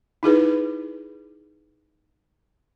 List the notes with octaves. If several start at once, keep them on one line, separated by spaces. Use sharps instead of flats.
D#4 E4 G#4 B4